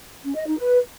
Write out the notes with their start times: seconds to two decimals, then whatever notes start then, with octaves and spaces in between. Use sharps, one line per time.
0.23 C#4
0.35 D#5
0.46 D#4
0.58 B4